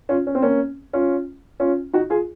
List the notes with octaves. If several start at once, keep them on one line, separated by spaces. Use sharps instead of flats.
C#4 F4
C#4
C4
A#3 C#4
C#4 F4
C#4 F4
D#4 F#4
F4 G#4